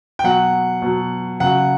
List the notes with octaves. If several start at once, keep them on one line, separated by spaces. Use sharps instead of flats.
G5
B2 F#3 F#5
B2 F#3
C#3 F#3 F#5